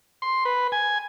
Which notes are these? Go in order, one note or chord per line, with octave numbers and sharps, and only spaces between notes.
C6
B4
G#5